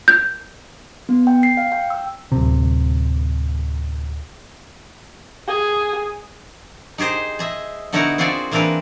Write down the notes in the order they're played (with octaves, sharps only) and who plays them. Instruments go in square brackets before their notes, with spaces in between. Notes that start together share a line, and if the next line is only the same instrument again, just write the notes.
[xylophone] G6
[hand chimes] B3
G5
C7
F5
G5
E6
[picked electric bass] D1 C3
[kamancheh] G#4
[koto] D#4 G4 G#4 C5 D#5
G#4 D#5 E5
D3 B3 D#4 E4 F#4 A#4
C4 F4 F#4 G#4 D5
E3 A#3 C4 D4 A#4 B4